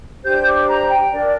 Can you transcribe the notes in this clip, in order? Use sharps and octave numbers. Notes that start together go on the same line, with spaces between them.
D4 G4 C5 G6
D6
A#5
G5
D4 A#4 D5